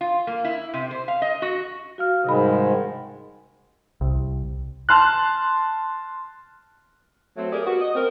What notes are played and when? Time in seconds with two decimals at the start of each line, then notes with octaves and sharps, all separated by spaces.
0.01 F4
0.27 A#3
0.44 E4
0.73 C3
0.91 C5
1.08 F5
1.22 D#5
1.42 F#4
1.98 F#4 F5 F6
2.24 G#2 C3 D#3 G3 G#3 B5
4.01 C2
4.89 A5 C6 F6 F#6
7.37 F#3 A3 C4
7.52 G4 G#4 A#4 D5
7.65 B3 F#4
7.81 D#5
7.95 C4 A#4